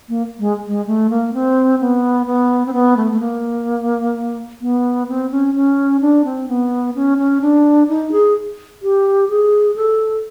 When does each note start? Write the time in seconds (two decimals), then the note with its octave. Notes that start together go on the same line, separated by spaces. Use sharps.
0.09 A#3
0.39 G#3
0.67 G#3
0.87 A3
1.10 A#3
1.33 C4
1.80 B3
2.26 B3
2.66 C4
2.73 B3
2.97 A3
3.12 A3
3.20 A#3
4.61 B3
5.08 C4
5.31 C#4
5.55 C#4
6.01 D4
6.25 C4
6.48 B3
6.96 C#4
7.18 C#4
7.41 D4
7.89 D#4
8.12 G#4
8.83 G4
9.29 G#4
9.76 A4